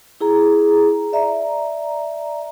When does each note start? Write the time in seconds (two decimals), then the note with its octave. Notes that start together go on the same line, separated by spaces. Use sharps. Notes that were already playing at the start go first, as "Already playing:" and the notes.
0.21 E4 G#4 A#5
1.13 D5 E5 A#5